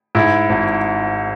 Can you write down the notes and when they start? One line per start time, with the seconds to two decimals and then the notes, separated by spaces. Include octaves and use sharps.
0.15 G#2 E4
0.49 G#1